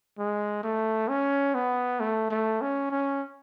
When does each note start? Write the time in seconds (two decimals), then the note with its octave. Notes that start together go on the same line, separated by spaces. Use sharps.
0.19 G#3
0.63 A3
1.09 C#4
1.55 B3
2.00 A3
2.31 A3
2.61 C#4
2.91 C#4